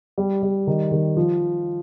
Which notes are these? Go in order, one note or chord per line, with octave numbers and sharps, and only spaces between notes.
G3
G3
D#3
D#3
F3